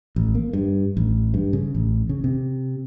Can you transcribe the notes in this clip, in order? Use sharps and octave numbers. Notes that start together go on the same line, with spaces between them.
A1
A#3
G2
A1
G2
C#3
A1
C#3
C3